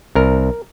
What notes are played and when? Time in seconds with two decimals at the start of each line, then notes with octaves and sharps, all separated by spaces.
0.15 C2 A#4